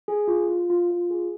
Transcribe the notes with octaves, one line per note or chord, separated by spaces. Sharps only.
G#4
F4
F4
F4
F4
G#4